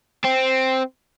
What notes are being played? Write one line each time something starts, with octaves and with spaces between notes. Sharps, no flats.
C4